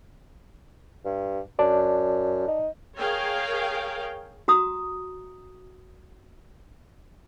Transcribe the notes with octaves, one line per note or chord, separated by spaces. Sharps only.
G2
F#2 D5 A5
D#4
G#4 A#4 C#5 F5 G5
F#4 A#5 D#6